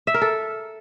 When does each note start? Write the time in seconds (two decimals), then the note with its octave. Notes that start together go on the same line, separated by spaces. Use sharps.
0.07 E5
0.14 A#4
0.22 A4